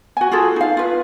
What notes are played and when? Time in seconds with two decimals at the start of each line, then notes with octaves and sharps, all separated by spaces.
0.17 F#4 G#5
0.32 F4 F#4 G#4 A4
0.56 D#4 F5
0.77 F4 B4